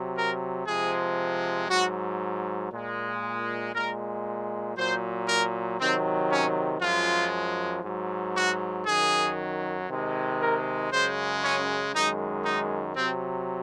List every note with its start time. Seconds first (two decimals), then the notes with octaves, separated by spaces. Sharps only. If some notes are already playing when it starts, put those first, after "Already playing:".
Already playing: C3 F#3
0.16 A#4
0.66 C3 F3 G#3 G#4
1.69 G#2 F#3 F#4
2.72 A#2 G#3
3.74 A#2 G#3 A#4
4.77 A#2 F#3 C5
5.28 A#4
5.79 C3 D#3 F#3 C4
6.30 C#4
6.81 F#2 F3 G#3 F4
7.83 G#2 F#3
8.36 F#4
8.86 F#2 D#3 F#3 G#4
9.89 C3 D#3 G#3
10.40 A#4
10.91 F#2 C#3 G#3 C5
11.42 C#4
11.93 F#2 D#3 G#3 D#4
12.45 D#4
12.95 C3 F#3 C4